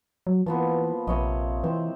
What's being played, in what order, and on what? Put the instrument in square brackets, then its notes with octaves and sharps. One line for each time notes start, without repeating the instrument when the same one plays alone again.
[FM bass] F#3
[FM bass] E3 [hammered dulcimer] F3 A#3 B3
[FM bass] A#1 [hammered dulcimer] C3 C#5 D#5
[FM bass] E3 [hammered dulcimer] C4 G4